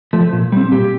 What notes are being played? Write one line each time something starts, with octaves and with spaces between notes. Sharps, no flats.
F3 A3
A#2
G3 C4
A#2 G4